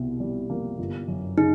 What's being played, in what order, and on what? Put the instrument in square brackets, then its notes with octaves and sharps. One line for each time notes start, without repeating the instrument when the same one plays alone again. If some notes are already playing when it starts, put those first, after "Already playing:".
Already playing: [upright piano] C2 B2
G3
A#3
G1
F#2
[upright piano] C#3 [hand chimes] D#4